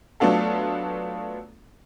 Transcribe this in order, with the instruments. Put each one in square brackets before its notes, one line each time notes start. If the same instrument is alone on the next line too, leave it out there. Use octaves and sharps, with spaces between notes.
[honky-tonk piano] F#3 A3 B3 D4 F4 A4